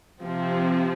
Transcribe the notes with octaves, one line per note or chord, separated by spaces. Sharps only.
C3 F3 C4